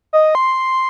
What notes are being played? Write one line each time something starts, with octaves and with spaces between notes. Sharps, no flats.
D#5
C6